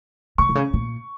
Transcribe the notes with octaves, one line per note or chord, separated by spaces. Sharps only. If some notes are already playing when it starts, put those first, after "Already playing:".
C3 C#6
C3
C#3
A#2